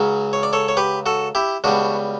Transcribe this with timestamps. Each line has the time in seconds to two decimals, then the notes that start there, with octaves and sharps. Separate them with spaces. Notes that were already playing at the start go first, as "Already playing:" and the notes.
Already playing: C#2 C#3 F#3
0.33 C#5
0.43 D5
0.53 A4 C#5
0.68 C#5
0.77 G4 B4
1.06 F#4 A4
1.35 E4 G4
1.64 C#2 B2 G3 D4 F#4